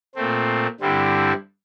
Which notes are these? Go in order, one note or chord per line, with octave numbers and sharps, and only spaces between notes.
A#2 A3 C4
G2 D3 G3 C4 E4